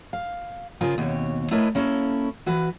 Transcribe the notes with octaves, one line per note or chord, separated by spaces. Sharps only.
F5
C#3 F4 G#4 A#4 C5
D#2 B2 C4 C#5
A3 E4 A#4 B4 C#5 D#5
A#3 C#4 E4 A4 C5 C#5
E3 F#4 B4